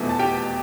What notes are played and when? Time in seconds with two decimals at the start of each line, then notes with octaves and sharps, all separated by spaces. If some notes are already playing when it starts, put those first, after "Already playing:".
Already playing: F1 E2 B2 A3
0.09 A5
0.19 G4 G5